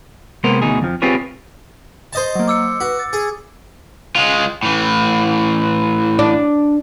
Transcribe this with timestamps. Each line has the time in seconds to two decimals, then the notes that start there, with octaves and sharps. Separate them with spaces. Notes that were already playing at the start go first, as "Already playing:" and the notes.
0.44 C3 G#3 A#3 B3 A#4 C5
0.62 D2 B2 D#4 G#4
0.82 F2 F3
1.02 C4 F4 G4 G#4 B4 C#5
2.13 C5 D#5 A5
2.35 F#3 A#3
2.48 D6 E6 C#7
2.80 F#4 B4
2.99 A6
3.13 G#4
4.16 G#3 F4
4.63 A2 E3
6.19 D4